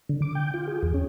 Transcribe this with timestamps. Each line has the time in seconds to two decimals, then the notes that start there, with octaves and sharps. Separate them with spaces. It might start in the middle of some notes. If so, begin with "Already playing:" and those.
0.09 D3
0.22 D6
0.35 G5
0.54 F4
0.68 G#4
0.82 E2
0.94 C#4